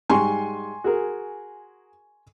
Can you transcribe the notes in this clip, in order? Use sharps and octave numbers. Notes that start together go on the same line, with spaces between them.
G#2 G3 G#5 C6 C#6
F#4 G#4 A#4